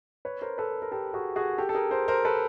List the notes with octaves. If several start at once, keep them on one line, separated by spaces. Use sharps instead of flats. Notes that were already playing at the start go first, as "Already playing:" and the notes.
B4 C#5
A#4 C5
A4 B4
A#4
G4 A4
F#4 G#4
F#4 G#4
G4 A4
A4
G#4 A#4
A#4 C5
A#4 C5
A4 B4